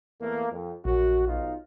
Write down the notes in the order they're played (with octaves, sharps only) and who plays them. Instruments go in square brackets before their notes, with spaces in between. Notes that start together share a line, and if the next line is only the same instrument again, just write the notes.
[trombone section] E2 A3 A#3
F2
[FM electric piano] A#1 [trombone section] F#2 F#4
[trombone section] B1 D#4 F4